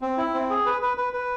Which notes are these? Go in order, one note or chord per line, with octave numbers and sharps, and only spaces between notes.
C4
E4
C4
G#4
B4
B4
B4
B4